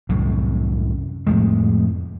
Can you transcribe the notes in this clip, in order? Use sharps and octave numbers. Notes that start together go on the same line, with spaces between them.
C2 F#2 A2 C3
F2 A2 C3 G#3